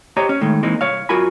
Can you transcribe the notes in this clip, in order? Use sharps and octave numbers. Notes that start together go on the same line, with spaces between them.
G4 C5 C#5 D#5 A#5
C#4
A2 D#3 G#3 A3
E3 G#3 A#3 C4 D#4
C2 C#5 F5
F#2 F4 F#4 A#4 G#5 B5